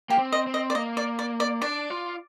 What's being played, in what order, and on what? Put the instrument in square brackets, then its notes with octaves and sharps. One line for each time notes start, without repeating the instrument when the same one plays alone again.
[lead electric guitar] A#3 [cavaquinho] G4
[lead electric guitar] C4
[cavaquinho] D#5
[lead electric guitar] C4
[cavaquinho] D#5
D5
[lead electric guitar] A#3 [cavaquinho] D#5
[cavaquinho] D5
D5
D5
[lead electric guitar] D4 [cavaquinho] D5
[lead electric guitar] F4